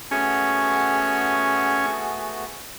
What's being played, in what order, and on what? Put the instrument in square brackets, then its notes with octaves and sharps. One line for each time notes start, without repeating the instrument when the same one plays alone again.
[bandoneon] A3 B3 F#4 [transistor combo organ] C#4 [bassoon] G#4